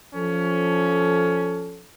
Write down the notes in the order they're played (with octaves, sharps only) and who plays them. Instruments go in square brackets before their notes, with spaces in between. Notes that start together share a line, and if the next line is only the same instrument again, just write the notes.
[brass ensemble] F3 C#4 A4